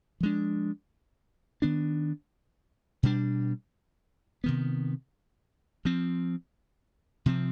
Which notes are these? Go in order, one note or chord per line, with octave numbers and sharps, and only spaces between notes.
F3 G#3 D4
D#3 B3 D4
B2 G3 D4
C3 D#3 B3
F3 C4
C3 F3 C4